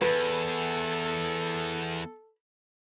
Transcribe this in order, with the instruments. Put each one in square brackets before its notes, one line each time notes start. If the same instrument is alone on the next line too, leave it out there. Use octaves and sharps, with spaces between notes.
[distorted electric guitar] E2 [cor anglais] A4 [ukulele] B4